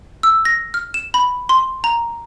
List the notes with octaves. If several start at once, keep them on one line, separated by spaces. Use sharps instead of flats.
E6
A#6
F6
E7
B5
C6
A#5